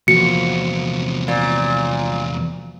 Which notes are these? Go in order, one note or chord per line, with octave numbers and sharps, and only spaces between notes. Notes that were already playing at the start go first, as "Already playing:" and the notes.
E2 C3 F3 A#3 F#4 C#7
A#2